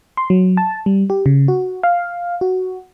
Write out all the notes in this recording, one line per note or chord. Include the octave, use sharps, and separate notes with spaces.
C6
F#3
A5
G3
G4
C#3
F#4
F5
F#4